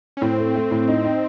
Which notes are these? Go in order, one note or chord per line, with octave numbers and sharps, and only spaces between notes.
C#4
A2 C4
A3
A3
A2
D#4
D#4